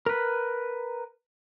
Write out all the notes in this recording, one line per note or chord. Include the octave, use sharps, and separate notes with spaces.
A#4 B4